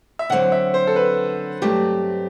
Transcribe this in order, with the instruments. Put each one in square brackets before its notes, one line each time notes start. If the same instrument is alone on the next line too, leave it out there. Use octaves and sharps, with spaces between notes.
[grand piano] E5
[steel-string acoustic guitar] D3 F#3 C4 [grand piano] F#5
[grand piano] E5
C5
A4
B4
[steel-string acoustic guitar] G2 F#3 A3 C4 [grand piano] G4